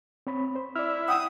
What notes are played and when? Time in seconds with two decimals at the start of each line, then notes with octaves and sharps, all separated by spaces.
0.27 C4 C#5 B5
0.55 C5
0.76 E4 D5 F6
1.08 F#5 G5 D#6 E6